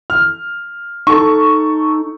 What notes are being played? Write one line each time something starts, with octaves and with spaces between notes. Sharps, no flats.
F6
D#4 A4 C#6